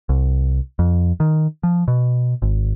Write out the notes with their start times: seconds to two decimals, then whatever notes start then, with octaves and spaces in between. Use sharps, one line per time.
0.09 C2
0.79 F2
1.20 D#3
1.63 F3
1.88 B2
2.42 G#1